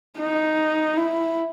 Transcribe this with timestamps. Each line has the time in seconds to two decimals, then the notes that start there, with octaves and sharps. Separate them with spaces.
0.19 D#4
0.97 E4